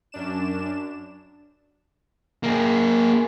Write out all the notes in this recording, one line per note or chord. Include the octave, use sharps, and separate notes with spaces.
F#2 D4 E7
A#3 G#4